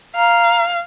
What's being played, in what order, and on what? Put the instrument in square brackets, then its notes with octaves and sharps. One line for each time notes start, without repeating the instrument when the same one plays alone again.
[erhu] F5 [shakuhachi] A#5